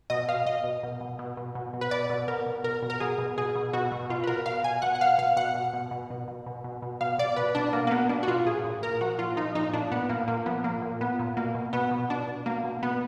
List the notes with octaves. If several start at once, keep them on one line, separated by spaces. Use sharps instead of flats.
B2 D#5
B2 F5
B2 D#5
B2
B2
B2
B2
B2
B2
B2
B4
B2 D5
B2
B2 A#4
B2
B2 A#4
B2
A#4
B2 G#4
B2
B2 G#4
B2
B2 F#4
B2
B2 F4
B4
B2 A#4
B2 F5
B2 G#5
B2 F#5
F#5
B2 F5
B2 F5
B2 F#5
B2
B2
B2
B2
B2
B2
B2
B2
B2 F5
B2 D5
B2 B4
B2 D4
B2 A#3
A#3
B2 B3
B2 D4
F#4
B2 F4
A#2 G#4
A#2
A#2 A#4
F3 F#4
A#2 F4
F3 D#4
A#2 D#4
A#2 D4
A#2 B3
A#2 A#3
A#2 A#3
F3 B3
A#2 A#3
A#2
A#2 B3
A#2
B2 A#3
B2
B2 B3
B2
B2 D4
B2
B2 A#3
B2
B2 B3